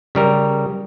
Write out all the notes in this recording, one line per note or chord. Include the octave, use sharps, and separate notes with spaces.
C#3 G3 A#4